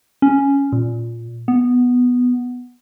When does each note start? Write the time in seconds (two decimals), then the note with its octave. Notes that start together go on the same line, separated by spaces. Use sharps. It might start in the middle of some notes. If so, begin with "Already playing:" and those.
0.22 C#4
0.72 A#2
1.48 B3